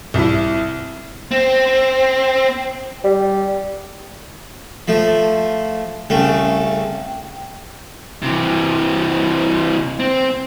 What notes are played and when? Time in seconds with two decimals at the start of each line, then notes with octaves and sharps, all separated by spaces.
0.14 C2 E4
1.31 C4
3.04 G3
4.88 F3 A3
6.10 C2 C#3 A3 G5
8.23 C3 E3
10.00 C4